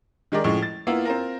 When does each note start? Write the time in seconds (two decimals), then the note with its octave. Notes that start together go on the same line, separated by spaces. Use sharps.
0.32 D#3 G#3 G4 A#4 D5
0.44 A2 C#3 F3 G#3
0.62 A6
0.87 A#3 B3 E4 F4
1.05 C4 F4 A#4